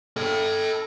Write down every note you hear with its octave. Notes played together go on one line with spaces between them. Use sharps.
A4 G5